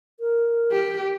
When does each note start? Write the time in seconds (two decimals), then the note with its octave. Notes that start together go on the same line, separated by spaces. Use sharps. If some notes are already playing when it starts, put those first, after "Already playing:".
0.20 A#4
0.72 G4